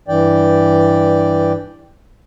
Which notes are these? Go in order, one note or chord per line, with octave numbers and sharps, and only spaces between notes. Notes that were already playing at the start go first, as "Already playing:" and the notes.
G2 E3 D5 G5